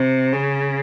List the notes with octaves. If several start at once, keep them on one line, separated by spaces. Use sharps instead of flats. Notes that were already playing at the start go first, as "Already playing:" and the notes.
Already playing: C3
C#3